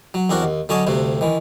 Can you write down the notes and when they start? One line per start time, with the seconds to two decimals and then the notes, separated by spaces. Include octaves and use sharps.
0.14 F#3
0.30 E2 C4 D4 F#4 A#4
0.43 D#2
0.69 D3 F#3 C#4 C#5 D#5 A5
0.87 D2 G2 C3 A3
1.21 D#3 E3